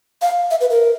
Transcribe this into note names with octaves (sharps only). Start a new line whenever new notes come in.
F5
E5
B4
A#4